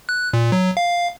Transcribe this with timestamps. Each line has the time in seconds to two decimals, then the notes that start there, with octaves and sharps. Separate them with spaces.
0.09 F#6
0.33 A#2
0.52 F#3
0.77 F5